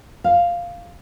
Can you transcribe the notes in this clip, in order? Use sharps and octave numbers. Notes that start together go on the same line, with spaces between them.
F5